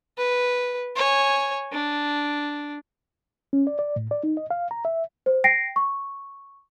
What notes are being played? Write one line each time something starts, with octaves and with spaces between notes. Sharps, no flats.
B4
C#5 G#5
D4
C#4
D5
D5
A2
D5
D#4
D#5
F5
A#5
E5
C5
G5 A#6 C7 D7
C#6